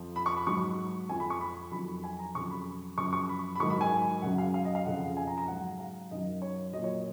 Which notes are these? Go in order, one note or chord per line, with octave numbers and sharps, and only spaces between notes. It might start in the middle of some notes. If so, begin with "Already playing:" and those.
Already playing: F2 F3
B5
C#6
B5
G#2 F#3 C#6
F2 F3 G#5
B5
C#6
B5
F2 D#3 F#3 B5
G#5
A#5
F2 C#3 F#3 C#6
B5
F#2 C#3 F3 C#6
C#6
B5
B5
G#2 D#3 F#3 C#6
B5
G#5
F#2 C#3 F#3 F#5
F5
F5
D#5
F5
F2 C#3 F3 F#5
G#5
A#5
A#5
G#2 F#3 F#5
F5
F#2 D#3 F#3 D#5
C#5
A#2 F#3 D#5
C#5